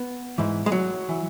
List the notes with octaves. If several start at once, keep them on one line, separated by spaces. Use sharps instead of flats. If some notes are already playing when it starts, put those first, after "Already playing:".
Already playing: B3
G#2 E3
G#3
F#3
E3